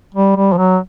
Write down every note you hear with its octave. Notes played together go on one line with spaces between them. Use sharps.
G3
G3
F3
F#3